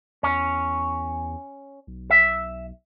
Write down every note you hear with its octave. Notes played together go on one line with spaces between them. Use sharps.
E2 C#4
B1
E5